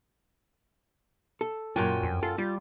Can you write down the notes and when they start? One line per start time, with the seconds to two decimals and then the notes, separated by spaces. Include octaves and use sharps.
1.41 A4
1.76 F#2 A#2 F#3 F4 G5 G#5
2.03 F2
2.23 F4 A4
2.38 G3 F4